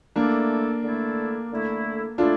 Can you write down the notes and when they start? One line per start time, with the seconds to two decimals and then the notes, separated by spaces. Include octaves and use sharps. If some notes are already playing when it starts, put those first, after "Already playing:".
0.16 D3 A3 A#3 D4 E4 A4
0.84 D3 A3 E4 A4
1.51 D3 A3 E4 A4
2.18 D3 A3 D4 E4 F4 A4